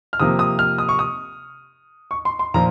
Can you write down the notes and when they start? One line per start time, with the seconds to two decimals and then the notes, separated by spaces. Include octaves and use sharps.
0.13 F6
0.20 C3 F3 A#3 D#6
0.39 D#6
0.59 F6
0.78 D#6
0.89 C#6
0.99 D#6
2.11 C#6
2.25 C6
2.39 C6
2.54 A#2 F3 A#5